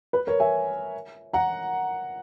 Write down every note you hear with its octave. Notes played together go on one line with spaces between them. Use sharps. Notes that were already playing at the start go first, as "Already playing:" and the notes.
B4
A#4 C#5
E5 G#5
F#5 A#5